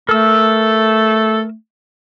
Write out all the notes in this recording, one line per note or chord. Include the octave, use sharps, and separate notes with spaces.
A3 A4 A#4 E6